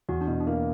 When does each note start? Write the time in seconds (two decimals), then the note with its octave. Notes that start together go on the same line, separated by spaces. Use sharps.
0.09 E2 F#4
0.21 D4
0.27 B2 E4
0.40 D4
0.47 A#3 E4